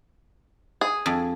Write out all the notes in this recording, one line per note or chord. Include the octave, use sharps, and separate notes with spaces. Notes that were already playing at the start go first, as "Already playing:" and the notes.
G#4
F2